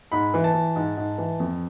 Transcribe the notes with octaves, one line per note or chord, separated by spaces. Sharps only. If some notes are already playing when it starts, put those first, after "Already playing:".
G#2 B5
E3
A5
E3
G#2
G#2
E3
F2